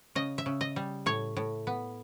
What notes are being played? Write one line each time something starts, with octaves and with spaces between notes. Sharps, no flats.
C#3 D#5
E5
C#3
D#5
G3
A2 C#5
A2
B3